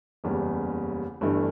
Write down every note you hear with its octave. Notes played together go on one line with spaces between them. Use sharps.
F#1 E2 C#3 G3
G1 G2 E3 A3